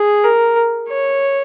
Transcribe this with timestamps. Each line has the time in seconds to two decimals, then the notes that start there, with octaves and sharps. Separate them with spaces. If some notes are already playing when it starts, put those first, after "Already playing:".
Already playing: G#4
0.24 A#4
0.88 C#5